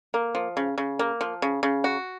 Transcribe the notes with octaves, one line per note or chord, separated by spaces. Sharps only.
A#3
F3
C#3
C#3
A#3
F3
C#3
C#3
F#4